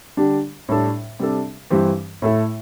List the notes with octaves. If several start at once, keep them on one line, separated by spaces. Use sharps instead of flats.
D3 G3 D4 G4
A2 G3 D4 A4
C3 G3 D4 A4
G2 E3 C4 G4
A2 A3 E4 A4